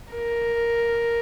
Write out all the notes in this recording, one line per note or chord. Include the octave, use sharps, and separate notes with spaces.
A#4